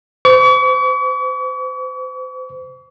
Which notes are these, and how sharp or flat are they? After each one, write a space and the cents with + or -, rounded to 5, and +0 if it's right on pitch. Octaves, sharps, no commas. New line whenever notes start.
C5 -35 C#6 +45